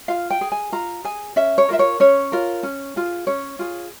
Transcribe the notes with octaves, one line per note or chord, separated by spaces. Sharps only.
F4 F5
G5
G#4
G#5
F4 A#5
G#4 G#5
C#4 E5
C#5
F4 A#4 E5
C#5
C#4 C#5
F4 A#4
C#4
F4 G#4
C#4 C#5
F4 G#4